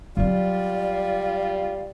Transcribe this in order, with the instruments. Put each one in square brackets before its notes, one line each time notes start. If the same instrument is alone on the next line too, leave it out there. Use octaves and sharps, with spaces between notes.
[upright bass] F#3 C4 [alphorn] G3 [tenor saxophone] F4 [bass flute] D5